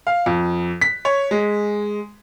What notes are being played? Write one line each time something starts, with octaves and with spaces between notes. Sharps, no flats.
F5
F2
B6
C#5
G#3